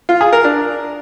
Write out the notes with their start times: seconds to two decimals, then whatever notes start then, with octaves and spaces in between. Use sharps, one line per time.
0.09 F4
0.21 G#4
0.33 A#4
0.44 D4